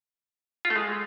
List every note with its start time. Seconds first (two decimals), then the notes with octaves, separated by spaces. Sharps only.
0.65 F4
0.70 A3
0.76 G#3